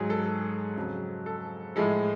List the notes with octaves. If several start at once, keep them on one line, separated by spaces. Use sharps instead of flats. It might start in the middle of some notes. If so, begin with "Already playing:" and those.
Already playing: G#2 F#3 G#4
A4
A4
F2 C#3 F#3
A4
A2 F3 G#3 A4